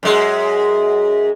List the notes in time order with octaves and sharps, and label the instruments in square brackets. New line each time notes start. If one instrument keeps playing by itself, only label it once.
[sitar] F#2 G#3